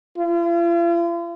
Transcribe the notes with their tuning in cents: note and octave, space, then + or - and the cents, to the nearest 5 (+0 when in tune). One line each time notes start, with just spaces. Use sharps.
F4 -45